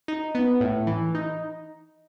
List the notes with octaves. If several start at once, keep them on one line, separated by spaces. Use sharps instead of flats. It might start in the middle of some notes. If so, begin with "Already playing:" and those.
D#4
B3
A2
E3
D#4